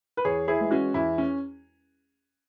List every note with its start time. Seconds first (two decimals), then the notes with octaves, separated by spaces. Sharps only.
0.17 B4
0.25 E2 G#4 C#5
0.48 E4 G#4
0.59 E3 G#3
0.71 C#4 F#4
0.94 E2 E4
1.18 C#4